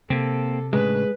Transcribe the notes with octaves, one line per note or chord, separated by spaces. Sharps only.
C3 A#3 C4 A4
A2 C#3 G#3 D4 B4